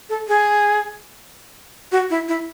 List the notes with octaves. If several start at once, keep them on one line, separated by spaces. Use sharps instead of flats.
A4
G#4
F#4
E4
E4